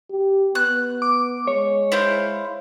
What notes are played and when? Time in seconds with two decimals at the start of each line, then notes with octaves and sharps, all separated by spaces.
0.10 G4
0.55 B3 F#6
1.02 D6
1.47 G#3 C#5
1.92 E4 C5 F5